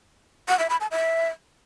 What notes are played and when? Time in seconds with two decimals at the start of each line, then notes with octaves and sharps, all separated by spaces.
0.48 F#5
0.59 E5
0.70 B5
0.81 A5
0.91 E5